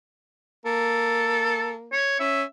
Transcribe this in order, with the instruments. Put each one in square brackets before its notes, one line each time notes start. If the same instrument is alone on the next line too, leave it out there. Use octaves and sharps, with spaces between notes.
[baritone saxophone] A#3 [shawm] A4
[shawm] C#5
[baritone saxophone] C#4 [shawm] E5